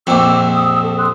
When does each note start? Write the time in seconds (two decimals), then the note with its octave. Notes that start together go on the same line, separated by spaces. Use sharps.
0.07 A#1 F2 D6 E6
0.53 D#6 E6
0.82 A4
0.98 C6 D#6 F#6